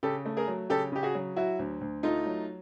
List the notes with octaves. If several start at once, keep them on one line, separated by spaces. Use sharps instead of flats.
C#3 G4 A4
A3
G#4 A#4
F#3
C#3 G4 A4
C#3 G4
F#4 G#4
F#3
F#3 E4 F#4
D2
D2
A3 D#4 F4
F#3